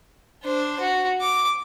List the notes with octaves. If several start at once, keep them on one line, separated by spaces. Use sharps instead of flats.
D4 C5
F#4
D6